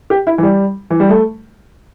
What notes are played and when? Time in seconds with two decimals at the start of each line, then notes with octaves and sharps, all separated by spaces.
0.10 G4
0.27 E4
0.38 E3
0.43 G3
0.90 E3
1.00 G3
1.09 A3